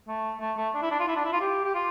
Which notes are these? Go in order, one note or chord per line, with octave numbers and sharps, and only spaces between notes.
A3
A3
A3
D4
E4
D4
F4
E4
D4
E4
F4
G4
G4
F4